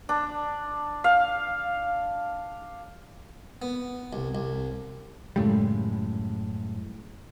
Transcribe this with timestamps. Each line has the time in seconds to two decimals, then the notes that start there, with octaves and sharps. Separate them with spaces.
0.09 D4
1.04 F5
3.62 B3
4.13 C2
4.35 C2
5.36 F#2 A2 C#3 G3 G#3